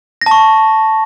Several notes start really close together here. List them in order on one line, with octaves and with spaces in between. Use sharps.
A#6 A5 C#6